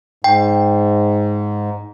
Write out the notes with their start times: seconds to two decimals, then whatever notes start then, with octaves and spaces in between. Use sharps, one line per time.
0.24 G#2 G5